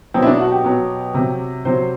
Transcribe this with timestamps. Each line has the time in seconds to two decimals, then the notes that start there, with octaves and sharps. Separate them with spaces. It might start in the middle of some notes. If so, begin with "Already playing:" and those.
0.14 B2 F#3 C4
0.22 E4
0.26 D4
0.39 F#4
0.52 G4
0.64 B2 F#3
1.14 C3 F#3
1.65 C3 F#3 C5